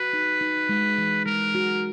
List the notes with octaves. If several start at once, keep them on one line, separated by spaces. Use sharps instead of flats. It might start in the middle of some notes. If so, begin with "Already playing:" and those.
Already playing: F#4 B4
D#4
D#4
G#3
E3
G#3 A#4
F#4